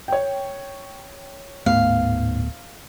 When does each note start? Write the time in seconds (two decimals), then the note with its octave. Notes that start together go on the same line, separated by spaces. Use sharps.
0.08 C#5 G5
1.66 D1 G#2 A3 B3 F5